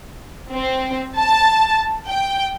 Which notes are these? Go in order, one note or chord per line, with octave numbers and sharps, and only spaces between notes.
C4
A5
G5